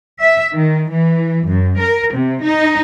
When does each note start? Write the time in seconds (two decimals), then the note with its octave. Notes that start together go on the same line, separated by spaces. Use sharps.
0.21 E5
0.54 D#3
0.90 E3
1.48 F#2
1.79 A#4
2.13 C3
2.44 D#4